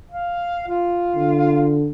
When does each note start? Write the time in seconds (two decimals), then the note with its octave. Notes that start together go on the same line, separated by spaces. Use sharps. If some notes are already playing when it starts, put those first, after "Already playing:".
0.11 F5
0.68 F4
1.15 D3